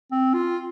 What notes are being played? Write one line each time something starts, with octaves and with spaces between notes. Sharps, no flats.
C4
F4